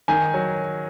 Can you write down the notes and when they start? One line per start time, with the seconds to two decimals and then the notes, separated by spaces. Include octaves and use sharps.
0.08 D#3 G#5
0.34 F#3